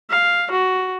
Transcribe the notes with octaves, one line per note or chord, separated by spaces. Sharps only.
F5
F#4